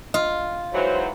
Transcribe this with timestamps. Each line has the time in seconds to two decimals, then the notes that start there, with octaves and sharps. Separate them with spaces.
0.14 F4 D#5
0.73 G#2 E3 F#3 C5